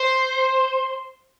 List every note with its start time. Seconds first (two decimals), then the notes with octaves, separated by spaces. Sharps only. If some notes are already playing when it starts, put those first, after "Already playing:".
Already playing: C5